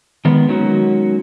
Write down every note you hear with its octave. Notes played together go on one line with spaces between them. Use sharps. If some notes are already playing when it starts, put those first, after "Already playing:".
D#3 G#3 B3
F#3 G#3 A#3 C#4 D#4 F#4